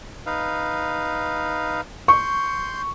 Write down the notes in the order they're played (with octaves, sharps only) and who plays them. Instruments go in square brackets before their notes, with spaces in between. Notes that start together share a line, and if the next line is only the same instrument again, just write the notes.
[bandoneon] D#4 B4 F5
[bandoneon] C6 G6 [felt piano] C#6